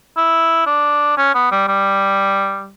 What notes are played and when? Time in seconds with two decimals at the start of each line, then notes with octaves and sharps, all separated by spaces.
0.17 E4
0.66 D4
1.17 C#4
1.35 B3
1.51 G3
1.67 G3